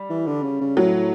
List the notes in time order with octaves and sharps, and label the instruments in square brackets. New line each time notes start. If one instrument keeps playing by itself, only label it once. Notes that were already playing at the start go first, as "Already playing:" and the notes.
Already playing: [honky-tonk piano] G3
[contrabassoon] E3
D3
C#3
C#3
[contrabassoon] A2 [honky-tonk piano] F#3